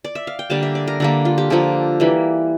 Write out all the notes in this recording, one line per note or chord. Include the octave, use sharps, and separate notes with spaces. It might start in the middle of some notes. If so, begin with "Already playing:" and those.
D5
E5
F5
G5
D3 G3 A#3 A5
E5
D5
A#4
D3 G3 A#3 A4
F4
G4
D3 F3 A#3 A4
E3 G3 A#3